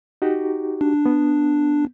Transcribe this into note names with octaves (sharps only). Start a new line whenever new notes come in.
D#4 F#4 G4
D4
B3